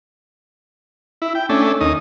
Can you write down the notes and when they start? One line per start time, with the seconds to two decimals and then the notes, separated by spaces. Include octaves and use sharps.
1.22 E4
1.35 G5
1.49 A3 C#4 D4
1.81 D#2 D#4 D#6